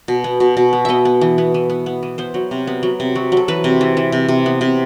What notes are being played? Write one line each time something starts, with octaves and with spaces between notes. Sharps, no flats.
B2
B3
B2
B2
B3
B3 D#5 E5
B3
E3
B3
E3
B3
B3
E3
B3 C5
F#3
C3
B3
F#3
C3
F#3
F#3
A4
E3 B4
C3
E3
E3
C3
C3
B3
C3